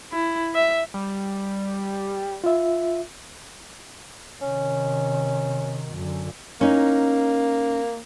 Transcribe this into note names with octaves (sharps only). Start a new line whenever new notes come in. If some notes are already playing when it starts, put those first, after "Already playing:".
E4
E5
G3
F4 E5
C3 D#3 C#4
F#2 D3
A#3 C#4 D#4